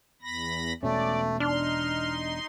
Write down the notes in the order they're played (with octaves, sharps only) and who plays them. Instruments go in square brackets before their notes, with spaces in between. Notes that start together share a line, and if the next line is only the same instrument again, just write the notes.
[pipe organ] E2 B5 A#6
[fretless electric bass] E1 B2 C#4 [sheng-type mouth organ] A3 [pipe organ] D5
[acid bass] D4 [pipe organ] D#4 C6 [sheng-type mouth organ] F6